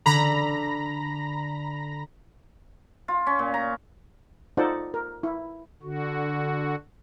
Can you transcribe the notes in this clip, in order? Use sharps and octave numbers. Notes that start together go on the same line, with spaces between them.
D3 A#5 B5 A#6
F4
C#4
A#2
A#5
D#4 F4 A4 C5 D5 F#5
A#4
E4
D3 F#4